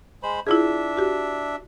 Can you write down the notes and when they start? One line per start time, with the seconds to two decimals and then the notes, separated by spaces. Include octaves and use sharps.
0.23 G#3 C5 B5
0.47 D4 E4 F4 G#4 E5
0.97 F#4 G4